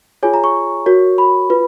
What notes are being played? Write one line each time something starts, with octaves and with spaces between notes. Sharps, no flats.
F4 G#4 C#5 G#5
A#5
C#6
F#4 A#4 C#5
B5
F4 B4